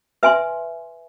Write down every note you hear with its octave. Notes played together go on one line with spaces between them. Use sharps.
B4 E5 G#5 C6